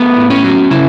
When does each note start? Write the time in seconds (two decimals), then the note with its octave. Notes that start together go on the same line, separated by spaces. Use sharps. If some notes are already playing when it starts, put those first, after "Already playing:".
Already playing: A3 B3
0.16 A2
0.30 C#4
0.44 F#3
0.71 C#3 E4